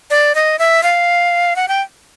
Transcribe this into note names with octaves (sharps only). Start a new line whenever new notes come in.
D5
D#5
E5
F5
F#5
G5